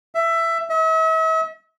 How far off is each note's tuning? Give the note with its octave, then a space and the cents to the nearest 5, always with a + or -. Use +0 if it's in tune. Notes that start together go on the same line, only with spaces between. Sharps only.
E5 +15
E5 -40